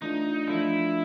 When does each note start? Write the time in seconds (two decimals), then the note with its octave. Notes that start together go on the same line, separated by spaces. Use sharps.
0.02 E3 A3 D4 D#4 F4
0.48 F3 A3 D4 E4 F4